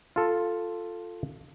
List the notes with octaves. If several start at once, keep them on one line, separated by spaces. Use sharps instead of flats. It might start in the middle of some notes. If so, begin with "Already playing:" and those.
F4 A4